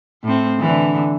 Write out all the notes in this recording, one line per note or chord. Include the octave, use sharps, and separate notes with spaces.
A2 C4
D3 E3